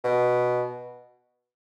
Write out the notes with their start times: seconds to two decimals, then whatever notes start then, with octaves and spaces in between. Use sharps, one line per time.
0.04 B2